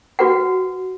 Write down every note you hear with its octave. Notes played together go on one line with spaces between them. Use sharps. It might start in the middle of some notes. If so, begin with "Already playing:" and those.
F#4 B4 F#5